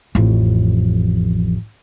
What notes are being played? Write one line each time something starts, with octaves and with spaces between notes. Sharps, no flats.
A1 F2